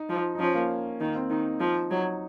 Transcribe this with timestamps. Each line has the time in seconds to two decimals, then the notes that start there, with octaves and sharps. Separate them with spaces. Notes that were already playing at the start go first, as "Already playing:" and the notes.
Already playing: D#4
0.09 F3
0.35 D#4
0.39 F3 C#4
0.54 A#3
1.00 D#3 A#3
1.15 C4
1.30 D#3 D#4
1.60 F3
1.91 F#3 D#4